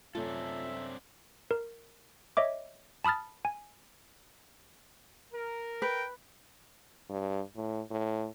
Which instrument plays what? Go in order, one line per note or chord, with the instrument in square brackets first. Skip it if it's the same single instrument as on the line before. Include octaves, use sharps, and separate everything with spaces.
[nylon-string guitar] F#2 C3 A3 [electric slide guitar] C4 D4 A4 [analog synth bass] F4 [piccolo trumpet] E5
[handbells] A#4
C#5 D#5 E5 D6
A5 B5 D#6 F6 A6
G#5
[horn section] A#4
[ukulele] B4 [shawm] G5
[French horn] G2
A2
A2